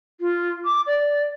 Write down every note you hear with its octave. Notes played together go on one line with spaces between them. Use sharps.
F4
D6
D5